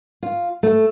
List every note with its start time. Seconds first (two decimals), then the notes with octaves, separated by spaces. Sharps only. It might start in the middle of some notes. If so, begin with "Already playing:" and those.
0.23 F4
0.63 A3